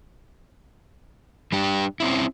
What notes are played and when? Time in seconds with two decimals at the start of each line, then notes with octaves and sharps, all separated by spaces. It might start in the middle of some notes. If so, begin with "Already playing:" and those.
1.52 G3 D4 G4
2.00 C4 C#4 E4